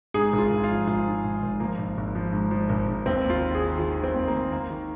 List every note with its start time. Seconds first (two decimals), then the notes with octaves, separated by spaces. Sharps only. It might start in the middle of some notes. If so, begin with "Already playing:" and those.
0.14 G#2 G#4
0.33 G#1
0.38 F4
0.51 G#1
0.64 F4
0.70 F3
0.87 G#1 F4
1.06 G#2
1.24 G#2
1.42 G#1
1.60 F3 A#3
1.78 G#1
1.97 G#1
2.15 F3
2.33 G#2
2.51 F3
2.69 G#1
2.88 G#1
3.06 D#2 C4
3.24 D#2
3.30 F4
3.42 D#3
3.55 G#4
3.61 D#3
3.79 D#3 F4
3.97 D#3
4.04 C4
4.15 D#2
4.28 A#3
4.33 D#2
4.52 D#2 A#3
4.70 D#3